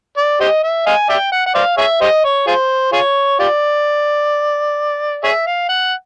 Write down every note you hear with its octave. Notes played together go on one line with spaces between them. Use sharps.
D5
G4 C5 D#5
E5
D#5 F5 G#5
D5 E5 G5
F#5
F#5
C5 D5 F5
G#4 C#5 E5
G4 C5 D#5
C#5
F4 G#4 C5
F4 G#4 C#5
F4 G4 D5
G#4 C#5 E5
F5
F#5